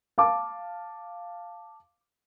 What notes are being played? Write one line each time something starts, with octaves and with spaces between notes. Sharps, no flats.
F5 A5 D6